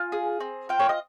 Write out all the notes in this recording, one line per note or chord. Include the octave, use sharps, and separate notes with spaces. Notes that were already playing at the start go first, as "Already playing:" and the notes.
Already playing: F4 G#5
G#4
C4
F4 G5
C#5
D#5